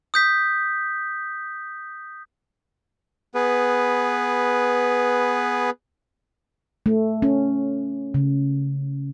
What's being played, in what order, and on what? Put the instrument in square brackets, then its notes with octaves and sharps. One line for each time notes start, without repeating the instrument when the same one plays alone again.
[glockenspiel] D#6 G6 B6
[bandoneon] B3 G#4 B4
[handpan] A3
C#4
C#3